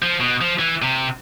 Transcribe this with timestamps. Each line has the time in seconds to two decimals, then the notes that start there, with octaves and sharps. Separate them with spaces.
0.02 F3
0.20 B2
0.41 F3
0.59 E3
0.82 C3